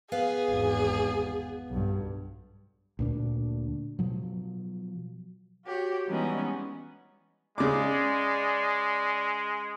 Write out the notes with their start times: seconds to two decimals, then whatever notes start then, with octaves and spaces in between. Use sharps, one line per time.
0.12 B3 G#4 B4 F5
0.50 G#1 E2
1.69 B1 G2
2.99 D2 A#2 D4
3.99 B2 F3 F#3
5.64 F#4 G4 C#5
6.08 E3 G3 G#3 B3 C#4 D#4
7.58 C#3 G#3 D5 D6